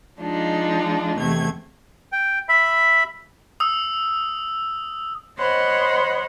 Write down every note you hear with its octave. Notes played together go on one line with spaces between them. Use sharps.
F3 G#3 D4 D#4 F4
E2 C3 A3 G#6
G5
E5 B5
D#6 E6
C5 C#5 D#5 F#5 B5 C6